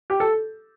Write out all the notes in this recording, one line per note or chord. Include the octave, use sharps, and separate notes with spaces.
G4
A4